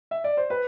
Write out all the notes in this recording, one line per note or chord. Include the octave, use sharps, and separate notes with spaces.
E5
D5
C5
B4